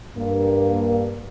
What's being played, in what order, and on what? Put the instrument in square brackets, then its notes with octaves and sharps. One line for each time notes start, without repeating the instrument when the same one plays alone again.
[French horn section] G2 A#3